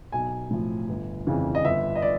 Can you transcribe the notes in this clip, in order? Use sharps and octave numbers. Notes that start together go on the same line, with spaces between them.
B1 G#5
A2 F3
G1
F2 C#3 E3
D#5
G1 E5
D#5
D5